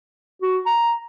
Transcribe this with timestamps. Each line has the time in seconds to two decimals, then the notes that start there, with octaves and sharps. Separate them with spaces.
0.42 F#4
0.66 A#5